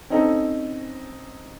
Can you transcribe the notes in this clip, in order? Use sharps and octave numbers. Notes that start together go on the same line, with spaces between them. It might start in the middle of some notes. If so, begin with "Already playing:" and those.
C4 C#4 D#4 A4